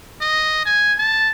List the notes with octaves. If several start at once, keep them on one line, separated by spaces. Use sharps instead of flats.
D#5
G#5
A5